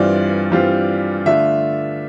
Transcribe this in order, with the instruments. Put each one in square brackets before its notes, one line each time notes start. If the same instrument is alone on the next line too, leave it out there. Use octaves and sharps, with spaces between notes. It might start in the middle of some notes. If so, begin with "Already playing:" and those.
Already playing: [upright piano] G2 E3 G3 C4 F4 D5
G2 E3 G3 C4 F4
D3 A3 D4 F4 E5